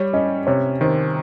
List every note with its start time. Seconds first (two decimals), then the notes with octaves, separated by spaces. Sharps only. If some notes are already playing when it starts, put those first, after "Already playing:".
Already playing: G3 C#5
0.13 C#4 D#5
0.47 C3 C#5
0.81 D#3 C5